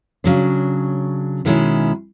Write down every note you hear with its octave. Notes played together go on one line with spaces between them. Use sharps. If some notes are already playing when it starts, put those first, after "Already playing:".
C#3 F#3 D4
B2 D#3 G#3 C#4 E4